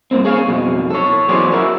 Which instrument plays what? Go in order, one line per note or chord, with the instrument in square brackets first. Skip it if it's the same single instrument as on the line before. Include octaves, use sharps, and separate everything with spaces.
[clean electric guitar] G2 A#2 A#3 C4
G#4 C#5 F5
B1 F2 B2
A4 C#5
E3 F#3 B3 G#4 C5 D5
E4 F#4 A#4